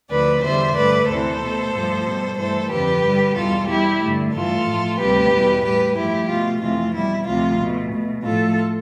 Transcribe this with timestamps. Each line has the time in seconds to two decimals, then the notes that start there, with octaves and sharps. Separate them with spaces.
0.10 D2 D3 F3 B4 D5
0.43 E2 D3 G3 C5 E5
0.76 G2 D3 A3 B4 D5
1.08 D2 C3 E3 A4 C5
1.41 B2 A3
1.73 G2 F3 A3
2.06 B2 G3
2.38 G2 E3 A3 A4 C5
2.70 F2 D3 F3 G4 B4
3.04 G2 D3 G3
3.36 E2 B2 G3 F4 A4
3.68 B2 G3 E4 G4
4.01 G2 D3 A3
4.33 G2 E3 A3 F4 A4
4.66 A2 F3 A3
4.99 D2 C3 G3 G4 B4
5.32 E2 B2 G3
5.64 A2 G3 G4 B4
5.96 G2 F3 A3 E4 G4
6.29 B2 A3 F4
6.61 F2 C3 E3 A3 F4
6.94 B2 G3 E4
7.27 D2 C3 F3 A3 F4
7.59 B2 A3
7.92 B2 A3
8.24 A2 F3 A3 F4 A4